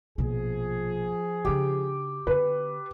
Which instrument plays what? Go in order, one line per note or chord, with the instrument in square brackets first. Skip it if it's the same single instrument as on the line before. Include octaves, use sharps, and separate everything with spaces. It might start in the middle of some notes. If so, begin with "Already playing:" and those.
[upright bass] A#1 B2 [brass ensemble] F3 G#4
[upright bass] C#3 D4 [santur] G4
[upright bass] D3 B3 [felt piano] B4